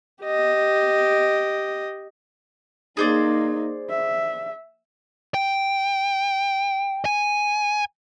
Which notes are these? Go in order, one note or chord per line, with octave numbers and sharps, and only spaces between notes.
G4 D#5
A#3 D#4 G#4 C5 D5
E5
G5
G#5